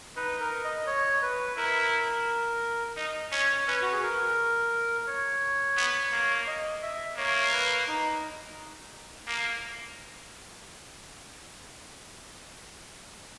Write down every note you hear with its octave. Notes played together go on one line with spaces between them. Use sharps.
D#4 B4
A#4
D#5
C#5
B4
E4 A#4
D#4 D#5
C#4 C#5
C#4 B4
F#4
G#4
A#4
C#5
B3
A#3
D#5
E5
A#3 C#5
B4
D#4
A#3